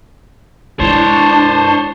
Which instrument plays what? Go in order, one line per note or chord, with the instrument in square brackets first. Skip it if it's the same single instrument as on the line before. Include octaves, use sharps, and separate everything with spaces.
[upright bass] G#3 E4 [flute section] D4 [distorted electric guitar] C5 C#5 [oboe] A5